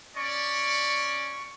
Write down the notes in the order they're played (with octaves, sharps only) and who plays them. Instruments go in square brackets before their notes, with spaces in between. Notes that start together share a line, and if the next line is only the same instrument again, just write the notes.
[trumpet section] C#4 D5 [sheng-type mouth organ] C#6